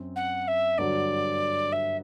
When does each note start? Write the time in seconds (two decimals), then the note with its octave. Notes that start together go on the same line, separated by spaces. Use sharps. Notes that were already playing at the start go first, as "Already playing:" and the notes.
Already playing: F#2 C4
0.16 F#5
0.47 E5
0.78 G2 D3 F#3 D5
1.72 E5